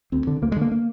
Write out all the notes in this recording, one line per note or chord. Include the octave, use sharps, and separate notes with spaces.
D2 C4
D3
D2 A#3
G#3
D3
A#3
A#3